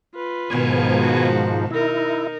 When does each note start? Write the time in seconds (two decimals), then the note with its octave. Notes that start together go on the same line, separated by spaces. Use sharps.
0.14 F4 B4
0.50 G#2 B2 D#3 F3 B3 G#5
1.00 F#4
1.71 D#4 E4 A#4